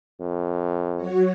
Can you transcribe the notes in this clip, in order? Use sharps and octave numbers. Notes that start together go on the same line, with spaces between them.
F2
F#3 F#4 C#5